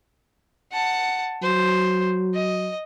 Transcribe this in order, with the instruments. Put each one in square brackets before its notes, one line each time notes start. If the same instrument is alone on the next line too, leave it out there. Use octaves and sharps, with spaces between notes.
[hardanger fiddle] F#5 A5
[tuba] F#3 [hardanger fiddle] C5
[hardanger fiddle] D#5